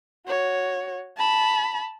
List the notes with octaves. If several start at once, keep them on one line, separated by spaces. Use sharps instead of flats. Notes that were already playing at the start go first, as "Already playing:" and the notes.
F#4 C#5
A5 B5